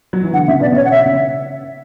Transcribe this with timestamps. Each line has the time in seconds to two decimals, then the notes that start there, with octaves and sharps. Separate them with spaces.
0.13 F#3
0.23 E3
0.33 D3 F#5
0.48 C#3 E5
0.60 B2 D5
0.72 C#3 C#5
0.85 F#5
0.91 E5
1.05 C#3